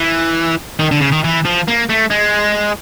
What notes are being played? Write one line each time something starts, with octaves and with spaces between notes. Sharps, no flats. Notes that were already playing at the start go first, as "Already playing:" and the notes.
Already playing: E3
D#3
D3
C#3
D#3
E3
F3
A#3
A3
G#3